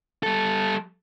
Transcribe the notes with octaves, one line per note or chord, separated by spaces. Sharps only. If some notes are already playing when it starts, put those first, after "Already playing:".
G3 A4